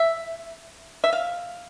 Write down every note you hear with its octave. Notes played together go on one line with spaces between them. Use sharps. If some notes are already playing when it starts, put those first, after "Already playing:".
Already playing: E5
E5
F5